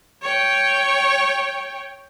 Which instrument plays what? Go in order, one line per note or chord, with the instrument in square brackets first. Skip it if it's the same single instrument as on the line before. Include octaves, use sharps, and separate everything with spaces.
[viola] C#5 G5